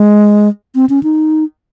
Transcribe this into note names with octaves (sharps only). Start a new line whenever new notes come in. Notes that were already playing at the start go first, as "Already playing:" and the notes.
Already playing: G#3
C4
C#4
D#4